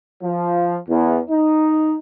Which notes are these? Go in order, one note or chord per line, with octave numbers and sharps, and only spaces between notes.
F3
E2
D#4